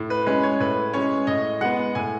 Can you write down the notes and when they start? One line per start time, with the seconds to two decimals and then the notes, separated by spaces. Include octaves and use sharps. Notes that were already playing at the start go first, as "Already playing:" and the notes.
Already playing: A2
0.10 B4
0.27 G#3 C#4 B4
0.43 C#5
0.60 A2 B4
0.94 G#3 C#4 C#5
1.27 A2 D#5
1.61 G#3 B3 F#5
1.95 A2 G#5